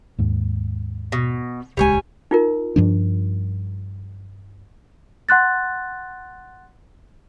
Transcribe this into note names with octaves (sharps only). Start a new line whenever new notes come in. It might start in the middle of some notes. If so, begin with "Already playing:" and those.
D#2 G#2
B2
D#1 C#2 G3 G#3 C#5 G#5
D#4 F4 A#4
G2 F3 D4
F#5 C6 F#6 A6